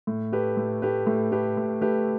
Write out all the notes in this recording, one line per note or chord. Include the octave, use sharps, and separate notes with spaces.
A2
A3 G4 B4
A2
A3 G4 B4
A2
A3 G4 B4
A2
A3 G4 B4